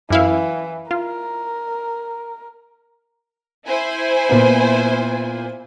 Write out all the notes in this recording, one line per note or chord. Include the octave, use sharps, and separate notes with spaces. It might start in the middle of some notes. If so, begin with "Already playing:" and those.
F#2 E3 E4 F5
F4 A#4
E4 C5 G#5
A#2 B3